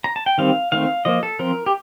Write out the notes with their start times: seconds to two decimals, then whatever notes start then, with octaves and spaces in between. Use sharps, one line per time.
0.04 A#5
0.16 A5
0.26 G5
0.38 D#3 G3 C4 F5
0.72 D#3 A3 C4 F5
1.05 F3 A#3 D#5
1.23 A4
1.39 F3 C4 A#4
1.66 G4